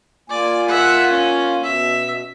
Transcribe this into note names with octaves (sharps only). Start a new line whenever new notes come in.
A#3 F4 D5 G#5
E5 F#5
C#4
B2 E5